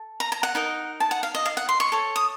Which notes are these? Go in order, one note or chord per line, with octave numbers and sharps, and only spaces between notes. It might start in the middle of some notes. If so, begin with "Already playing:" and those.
Already playing: A4
A#5
A#5
F#5
D#4 A#4 D#5
A5
F#5
F5
D#5
F5
F#5
C6
C#6
A4 C#5
D#6